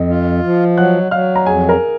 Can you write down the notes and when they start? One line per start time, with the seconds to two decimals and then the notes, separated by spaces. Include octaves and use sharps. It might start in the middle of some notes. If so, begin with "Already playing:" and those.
Already playing: F2 D#5
0.09 F4
0.44 F3
0.78 F#3 F#5 F#6
1.11 F#3 F5 F6
1.36 A#5
1.46 F2 G#4 G#5
1.69 A#4 A#5